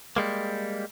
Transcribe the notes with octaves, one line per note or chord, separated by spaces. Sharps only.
G3 G#3 A#3